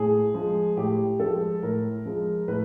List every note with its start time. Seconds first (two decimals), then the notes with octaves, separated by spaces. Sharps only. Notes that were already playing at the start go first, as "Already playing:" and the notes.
Already playing: A2 G#4
0.34 F3 G#3
0.77 A2 G4
1.19 F3 G#3 A4
1.62 A2 A#4
2.05 F3 G#3
2.48 A2 B4